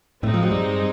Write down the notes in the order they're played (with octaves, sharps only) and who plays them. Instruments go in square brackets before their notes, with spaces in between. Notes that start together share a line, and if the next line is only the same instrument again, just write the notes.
[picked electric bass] A2 A3 [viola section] G#3 C4 D#4
[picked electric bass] F3
F#3
G2 G3